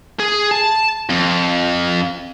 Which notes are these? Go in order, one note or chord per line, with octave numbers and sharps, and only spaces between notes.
G#4
A5
F2